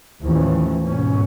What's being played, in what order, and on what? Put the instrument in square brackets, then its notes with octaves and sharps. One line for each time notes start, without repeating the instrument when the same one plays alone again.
[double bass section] D#2 A2 E3 F3 C#4
G#2 B2 C#4